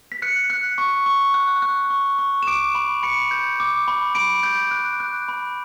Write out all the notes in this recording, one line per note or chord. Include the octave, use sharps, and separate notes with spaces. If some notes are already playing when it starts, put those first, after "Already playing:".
B6
F#6 C#7
F#6
C#6
C#6
F#6
F#6
C#6
C#6
E7
D6 D7
B5
B5 C#7
G6
D6
B5
B5 D7
G6
F#6
F#6
B5